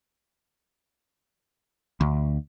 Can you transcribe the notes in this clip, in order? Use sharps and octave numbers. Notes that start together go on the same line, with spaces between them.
D2